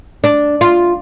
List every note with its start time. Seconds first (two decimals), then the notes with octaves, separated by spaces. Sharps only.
0.24 D4
0.61 F4